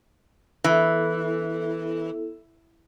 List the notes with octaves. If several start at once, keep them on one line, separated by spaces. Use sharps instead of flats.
E3 B3 E4 A4